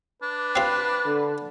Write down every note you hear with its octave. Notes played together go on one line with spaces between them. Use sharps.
D4 B4
C4 F4
D3